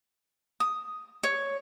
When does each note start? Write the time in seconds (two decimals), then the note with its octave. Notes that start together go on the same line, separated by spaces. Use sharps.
0.60 D#6
1.23 C#5